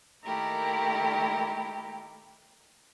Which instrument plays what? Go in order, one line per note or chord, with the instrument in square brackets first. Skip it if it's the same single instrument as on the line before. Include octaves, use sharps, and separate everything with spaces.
[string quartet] D#3 A3 A#3 E4 G4 A#4